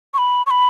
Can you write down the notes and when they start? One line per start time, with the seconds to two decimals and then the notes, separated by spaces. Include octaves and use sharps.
0.14 C#6
0.18 B5
0.46 C#6
0.51 B5